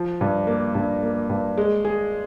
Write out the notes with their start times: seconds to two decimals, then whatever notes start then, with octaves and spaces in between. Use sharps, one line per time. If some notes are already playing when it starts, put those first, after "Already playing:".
Already playing: F3
0.21 G2
0.47 A#3
0.75 G2
1.03 A#3
1.30 G2
1.58 G#3
1.85 G#4